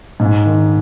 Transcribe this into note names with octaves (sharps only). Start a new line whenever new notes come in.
G#2
D#3